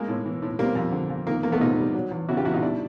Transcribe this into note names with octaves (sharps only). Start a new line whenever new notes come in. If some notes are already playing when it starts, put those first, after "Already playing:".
Already playing: G#3 A#3
A2
E3
A2
G3 A#3 C4
F2
D3
F2
D#3 A#3
E2 A#3
A3 B3
C3 D#4 F4
G3
F#3
E2
C#3 E4 F#4
F4 G4
E2 E4 F#4
D#4 F4
G3 D4 E4